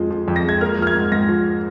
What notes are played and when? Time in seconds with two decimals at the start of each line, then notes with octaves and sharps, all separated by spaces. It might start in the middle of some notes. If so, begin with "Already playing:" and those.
Already playing: F2 F3 G#3
0.10 F3
0.28 F2
0.36 A#6
0.45 G#3 G#6
0.61 A#3 F6
0.78 F3 F6
0.87 G#6
0.95 G#2
1.12 G#2 A#6
1.29 F3